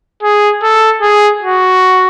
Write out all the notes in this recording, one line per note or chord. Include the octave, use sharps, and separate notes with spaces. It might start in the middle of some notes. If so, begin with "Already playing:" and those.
G#4
A4
G#4
F#4